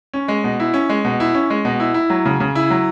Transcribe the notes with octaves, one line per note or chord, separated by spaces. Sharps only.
C#4
G#3
B2
E4
C#4
G#3
B2
E4
C#4
G#3
B2
E4
E4
F#3
C#3
C#3
E4
F#3